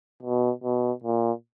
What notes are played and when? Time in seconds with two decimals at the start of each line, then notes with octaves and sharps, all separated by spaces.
0.23 B2
0.64 B2
1.04 A#2